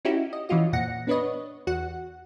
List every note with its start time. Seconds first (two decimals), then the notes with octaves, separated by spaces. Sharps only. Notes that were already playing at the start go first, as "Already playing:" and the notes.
0.05 C#4 D#4 E4 F#4 G4
0.33 D#5
0.49 E3 F3 C#4 F4 F#4 D#5
0.73 F2 A#2 F#5 A#6 C#7
1.07 B3 D4 B4 C#5 D#5
1.67 E2 F#4 F#5